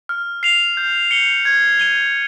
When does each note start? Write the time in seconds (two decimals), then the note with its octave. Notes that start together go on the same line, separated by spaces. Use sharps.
0.09 F6
0.43 C7 F7
0.77 G6
1.11 C#7 G7
1.45 G#6
1.80 D#7 G7